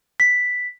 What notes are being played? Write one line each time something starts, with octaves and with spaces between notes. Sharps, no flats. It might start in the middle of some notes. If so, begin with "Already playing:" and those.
B6